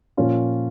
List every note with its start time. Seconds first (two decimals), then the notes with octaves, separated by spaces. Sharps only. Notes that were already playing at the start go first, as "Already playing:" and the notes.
0.17 A#2 F3 C#4 F4